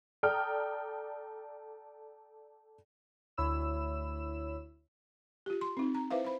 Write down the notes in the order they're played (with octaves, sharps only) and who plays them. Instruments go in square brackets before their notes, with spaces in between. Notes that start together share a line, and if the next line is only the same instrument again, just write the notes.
[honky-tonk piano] A4 D5 G5 A#5 D#6 F6
[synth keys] D2 E4 C#5 B5 E6 E7
[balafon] F4 G4
C6
C4 D#4
A#5
E4 B4 C5 E5 F5
C5 B5